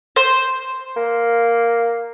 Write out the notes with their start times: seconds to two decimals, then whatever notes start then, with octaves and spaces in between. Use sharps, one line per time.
0.16 C5
0.96 A#3